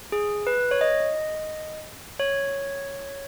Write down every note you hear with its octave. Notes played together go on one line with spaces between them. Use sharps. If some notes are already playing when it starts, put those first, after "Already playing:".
G#4
B4
C#5
D#5
C#5